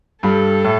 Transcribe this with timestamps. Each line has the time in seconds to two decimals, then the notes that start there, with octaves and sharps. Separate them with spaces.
0.23 G2 G3 A4
0.65 A2